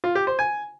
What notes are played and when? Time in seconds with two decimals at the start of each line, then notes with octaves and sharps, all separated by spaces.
0.04 F4
0.15 G4
0.27 C5
0.39 G#5